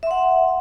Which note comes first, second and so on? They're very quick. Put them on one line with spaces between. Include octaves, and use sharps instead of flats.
E5 C6 F#5